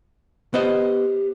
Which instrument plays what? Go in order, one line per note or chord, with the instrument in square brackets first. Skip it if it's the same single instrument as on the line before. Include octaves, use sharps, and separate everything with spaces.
[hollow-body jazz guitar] B3 C5 D#5 [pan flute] G4